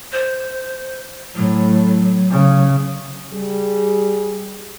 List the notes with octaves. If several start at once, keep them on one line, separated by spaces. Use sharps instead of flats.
C5
A2 F#3
C#3
G3 G#4